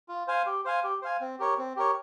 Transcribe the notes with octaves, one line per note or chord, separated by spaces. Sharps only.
F4
C5 F5 G#5
G4
C5 F5 G#5
G4
C5 F5 G#5
C4
G4 A#4 C#5
C4
G4 A#4 C#5